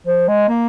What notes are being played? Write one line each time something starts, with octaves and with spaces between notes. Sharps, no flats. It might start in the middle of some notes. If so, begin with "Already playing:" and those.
F3
G#3
A#3